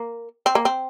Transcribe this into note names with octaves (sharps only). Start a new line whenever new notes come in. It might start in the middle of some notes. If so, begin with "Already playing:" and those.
Already playing: A#3
C4
A#3
C4